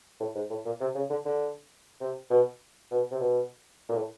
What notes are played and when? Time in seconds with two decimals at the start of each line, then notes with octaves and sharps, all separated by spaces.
0.20 A2
0.35 G#2
0.50 A2
0.65 A#2
0.81 C3
0.95 C#3
1.10 D3
1.25 D3
2.00 C3
2.30 B2
2.91 B2
3.11 C3
3.20 B2
3.89 A#2
3.96 A2